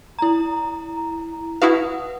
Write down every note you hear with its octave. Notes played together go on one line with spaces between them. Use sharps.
E4 A#5
E4 F#4 B4 F5 F#5 D#6